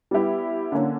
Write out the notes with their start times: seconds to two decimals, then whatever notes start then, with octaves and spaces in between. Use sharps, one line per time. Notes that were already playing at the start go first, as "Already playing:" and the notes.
0.11 G3 B3 E4 G4
0.72 D3 A#3 C#4